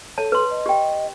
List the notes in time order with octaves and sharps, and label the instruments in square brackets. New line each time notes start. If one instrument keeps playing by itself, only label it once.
[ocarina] A4 [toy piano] C#5 A5
[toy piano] B4 C6
[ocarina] D#5
[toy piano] G4 G5